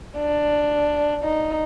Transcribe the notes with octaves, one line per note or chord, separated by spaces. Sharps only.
D4
D#4